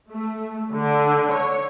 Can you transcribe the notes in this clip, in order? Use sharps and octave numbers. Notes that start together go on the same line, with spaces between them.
A3
D3
C#5